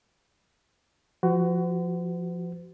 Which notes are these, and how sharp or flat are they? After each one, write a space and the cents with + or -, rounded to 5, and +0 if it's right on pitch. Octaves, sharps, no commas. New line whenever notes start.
F3 +0 F#4 +15 C5 -40